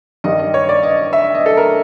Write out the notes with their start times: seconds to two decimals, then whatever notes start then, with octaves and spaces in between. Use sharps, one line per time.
0.24 G2 D#3 G3 D#5
0.39 D#5
0.54 C#5
0.69 D5
0.83 D#5
1.13 E5
1.35 D#5
1.46 A4
1.57 A#4